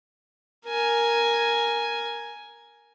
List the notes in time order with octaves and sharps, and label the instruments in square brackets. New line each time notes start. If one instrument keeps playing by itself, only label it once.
[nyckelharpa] A#4 G#5